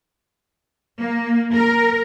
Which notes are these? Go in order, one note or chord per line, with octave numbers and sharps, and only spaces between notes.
A#3
A#4